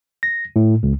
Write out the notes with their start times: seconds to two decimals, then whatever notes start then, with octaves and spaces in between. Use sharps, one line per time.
0.23 A#6
0.56 A2
0.83 C#2